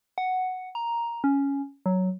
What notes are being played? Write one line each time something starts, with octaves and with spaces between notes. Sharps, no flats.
F#5
A#5
C#4
F#3